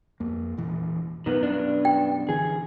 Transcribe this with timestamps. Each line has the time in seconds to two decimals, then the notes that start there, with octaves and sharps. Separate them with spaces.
0.20 F2 A#3
0.57 E1 A#2 E3
1.26 F#2 B2 D#3 B3
1.43 G2 D4
1.85 G5
2.29 D3 E3 G#4